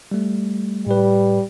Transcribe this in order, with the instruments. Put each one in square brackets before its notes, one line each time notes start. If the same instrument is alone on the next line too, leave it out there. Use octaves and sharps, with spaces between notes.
[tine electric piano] G3 A3
[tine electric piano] A2 B4 [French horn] G3